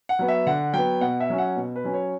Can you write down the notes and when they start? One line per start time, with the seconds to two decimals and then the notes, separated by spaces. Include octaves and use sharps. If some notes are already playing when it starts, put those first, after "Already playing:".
0.09 F#5
0.19 F#3 B3
0.28 E5
0.46 D3 F#5
0.73 F#3 B3 G5
1.01 B2 F#5
1.20 E5
1.30 F#3 C#4
1.38 F#5
1.56 B2
1.76 B4
1.84 F#3 C#4
1.94 C#5